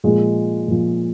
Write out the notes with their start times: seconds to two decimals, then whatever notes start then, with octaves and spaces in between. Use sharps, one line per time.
0.04 A#2 F3 G#3
0.68 A#2 F3